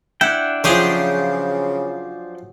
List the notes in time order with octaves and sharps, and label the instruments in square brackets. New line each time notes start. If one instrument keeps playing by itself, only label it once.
[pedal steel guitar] D4 F#5 G5 [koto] E4
[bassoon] C#3 [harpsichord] F3 C5 C6 [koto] F#3 G4 G#4